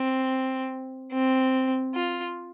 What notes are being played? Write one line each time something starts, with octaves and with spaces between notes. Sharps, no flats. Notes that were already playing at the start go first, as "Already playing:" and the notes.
Already playing: C4
C4
F4